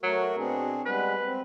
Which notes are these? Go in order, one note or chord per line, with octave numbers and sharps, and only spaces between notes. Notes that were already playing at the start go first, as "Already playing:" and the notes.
F#3 A3 F#4 A#4
B2 C4 D4 G#4
G3 G#3 B3 B4
C4